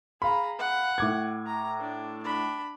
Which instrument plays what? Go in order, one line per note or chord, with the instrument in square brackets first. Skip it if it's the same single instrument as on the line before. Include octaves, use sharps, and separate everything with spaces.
[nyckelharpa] G#4 A#5 [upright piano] F5 B5
[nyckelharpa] F#5
[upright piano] A2 D6 G#6
[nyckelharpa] A#5
D4
D4 B5